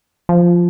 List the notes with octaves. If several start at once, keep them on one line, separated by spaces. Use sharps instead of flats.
F3